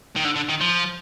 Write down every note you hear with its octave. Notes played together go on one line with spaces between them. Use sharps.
D#3
D3
D3
D#3
F3